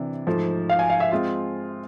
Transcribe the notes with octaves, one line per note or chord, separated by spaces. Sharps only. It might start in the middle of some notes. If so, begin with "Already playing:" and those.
Already playing: C3 E3 D4
G#2 F3 A3
F5
G#5
F5
E5
G#3 C4 F4